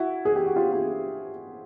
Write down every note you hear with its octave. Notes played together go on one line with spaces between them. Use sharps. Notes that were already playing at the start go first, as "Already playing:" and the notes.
Already playing: E4 F#4
G#4
G4
F#4
F4 G4
F4 G4